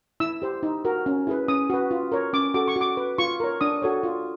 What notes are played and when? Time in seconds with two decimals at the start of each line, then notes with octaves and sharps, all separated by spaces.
0.20 E4 E6
0.42 G4 C5
0.63 D#4
0.85 F#4 A#4
1.06 C#4
1.27 E4 G#4 B4
1.48 C#4 D#6
1.70 F#4 B4
1.91 F4
2.12 A#4 C#5
2.33 C#4 D6
2.54 F#4 A4 D6
2.68 C#6
2.76 F#4 D6
2.97 B4
3.18 F4 C#6
3.40 A#4 C#5
3.61 D4 D#6
3.82 F#4 A4 C#5
4.03 F4